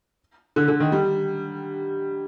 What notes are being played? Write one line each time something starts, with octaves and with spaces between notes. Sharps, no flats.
D3
D3
D#3
G3